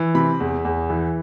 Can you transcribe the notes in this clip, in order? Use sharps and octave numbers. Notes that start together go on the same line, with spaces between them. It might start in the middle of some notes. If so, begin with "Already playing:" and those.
Already playing: E3
C3 B5
E2
E2
E3